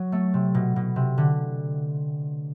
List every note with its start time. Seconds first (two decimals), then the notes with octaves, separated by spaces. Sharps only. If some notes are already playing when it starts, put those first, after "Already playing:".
Already playing: F#3
0.12 A3
0.34 C3
0.54 B2
0.76 B2
0.96 C3
1.18 D3